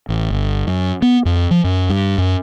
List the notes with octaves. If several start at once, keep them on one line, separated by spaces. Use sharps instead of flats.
A1
G1
F#2
B3
F2
F3
F#2
G2
F#2